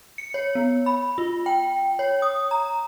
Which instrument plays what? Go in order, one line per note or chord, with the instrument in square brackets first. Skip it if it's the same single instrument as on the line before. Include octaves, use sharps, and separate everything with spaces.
[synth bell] C#7
C#5
B3
B5
F4
G5
C#5
D#6
A#5